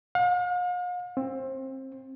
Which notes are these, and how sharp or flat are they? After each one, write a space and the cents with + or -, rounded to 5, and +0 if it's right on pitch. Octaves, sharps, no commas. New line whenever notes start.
F5 +45
C4 +25